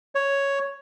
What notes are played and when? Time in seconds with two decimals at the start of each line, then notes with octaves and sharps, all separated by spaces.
0.15 C#5